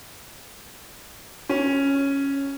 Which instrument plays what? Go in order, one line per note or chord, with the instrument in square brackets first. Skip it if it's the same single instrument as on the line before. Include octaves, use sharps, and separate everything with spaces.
[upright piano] C#4